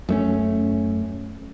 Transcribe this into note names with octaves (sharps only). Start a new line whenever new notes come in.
F#2 A3 C#4